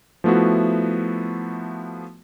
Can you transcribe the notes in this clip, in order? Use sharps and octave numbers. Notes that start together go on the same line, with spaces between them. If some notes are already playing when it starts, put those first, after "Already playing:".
F3 A3 B3 E4 F#4